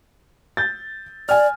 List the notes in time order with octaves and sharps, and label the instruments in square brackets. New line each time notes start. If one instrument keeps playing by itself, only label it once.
[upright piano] G6 A6
[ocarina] D5 [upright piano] G#5 F6